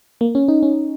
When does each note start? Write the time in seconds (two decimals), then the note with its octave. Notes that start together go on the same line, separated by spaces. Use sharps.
0.21 A#3
0.35 C#4
0.48 D#4
0.63 C#4